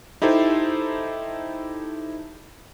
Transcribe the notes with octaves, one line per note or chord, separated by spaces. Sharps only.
D#4 E4 G4 A4 C5